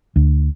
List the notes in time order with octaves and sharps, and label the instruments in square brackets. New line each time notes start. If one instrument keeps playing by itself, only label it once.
[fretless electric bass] D2